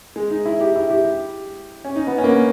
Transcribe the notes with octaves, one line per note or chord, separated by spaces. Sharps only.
G#3
D#4
E4
G4
E4
G4
C#4
D#4
B3
C#4
A#3
B3